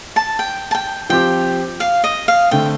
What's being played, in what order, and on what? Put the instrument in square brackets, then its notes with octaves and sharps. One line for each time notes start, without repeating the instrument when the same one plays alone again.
[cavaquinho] A5
G5
A5
G5
[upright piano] F3 C4 G4 [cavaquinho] G5
[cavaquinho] F5
D#5
F5
[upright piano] D3 A3 C4 [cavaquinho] G5